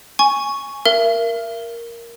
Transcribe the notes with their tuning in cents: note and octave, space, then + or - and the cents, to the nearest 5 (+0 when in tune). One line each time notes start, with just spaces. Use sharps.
G#5 +0 C#6 +0
A#4 +0 E5 +40